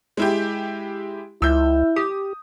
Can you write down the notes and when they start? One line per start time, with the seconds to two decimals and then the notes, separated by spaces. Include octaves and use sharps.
0.17 G#3 E4 G4
1.42 C#2 E4 E6 G6
1.96 G4 D#6